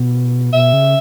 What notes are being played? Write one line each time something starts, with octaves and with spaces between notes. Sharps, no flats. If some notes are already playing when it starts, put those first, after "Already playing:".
Already playing: B2
B2 E5
C#3